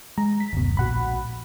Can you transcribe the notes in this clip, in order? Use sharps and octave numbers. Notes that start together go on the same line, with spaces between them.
G#3 A#5
B6
F#1 D2 B2
A#1 F#4 F#5 B5